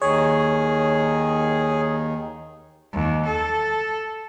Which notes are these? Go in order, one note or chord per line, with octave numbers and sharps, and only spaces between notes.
D#2 D#3 G#4 C#5
D#2
A4